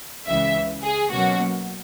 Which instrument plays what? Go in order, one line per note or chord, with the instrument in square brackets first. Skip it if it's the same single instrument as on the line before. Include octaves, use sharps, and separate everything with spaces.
[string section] C#2 C#3 E3 E5
G#4
B2 F#3 A#3 C#4 F#4